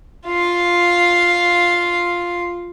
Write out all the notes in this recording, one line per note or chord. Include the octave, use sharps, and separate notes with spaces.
F4 F5